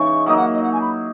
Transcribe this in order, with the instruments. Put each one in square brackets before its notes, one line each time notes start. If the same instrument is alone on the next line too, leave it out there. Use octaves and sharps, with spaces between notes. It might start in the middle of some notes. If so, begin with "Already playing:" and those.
Already playing: [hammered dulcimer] C#3 E3 G#3 D#4 [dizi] C#6
[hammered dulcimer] F#3 A#3 D#4 [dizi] D#6
[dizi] F#5
D#5
F#5
G#5
B5